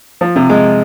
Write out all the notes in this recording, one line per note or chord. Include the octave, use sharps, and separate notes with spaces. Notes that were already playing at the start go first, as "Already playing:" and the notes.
F3
C3
G#3